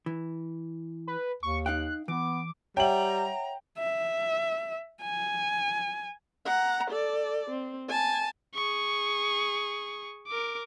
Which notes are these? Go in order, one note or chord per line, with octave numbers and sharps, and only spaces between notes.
E3
B4
D#2 C#6
D#4 F5 G5 F#6
E3 B3 D6
G3 C#5 E5 F#5 G5 A#5 F#7
E5
G#5
F#5 A#5
A4 D5
C4
G#5 A5
G#4 C#6
A#4 D6